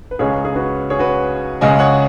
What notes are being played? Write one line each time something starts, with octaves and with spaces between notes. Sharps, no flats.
B4
C#2 C#3 G#3 G#4 C#5
G#4
F#4 B4
G#4 C#5
F#4 B4
C#2 C#3 G#3 D#5 G#5
C#5 F#5